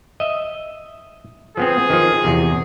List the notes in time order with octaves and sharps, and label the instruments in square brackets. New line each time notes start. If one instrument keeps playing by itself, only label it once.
[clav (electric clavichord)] D#5 E5
[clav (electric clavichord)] F3 B3 C4 [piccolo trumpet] G#4
[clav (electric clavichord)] D#3 F3
E2 C3